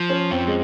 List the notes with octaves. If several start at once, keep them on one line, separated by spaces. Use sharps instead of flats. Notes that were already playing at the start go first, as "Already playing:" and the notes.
Already playing: F3
C#4
F2 C4
G#3